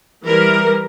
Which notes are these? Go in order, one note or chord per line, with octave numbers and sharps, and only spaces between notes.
E3 G3 A#4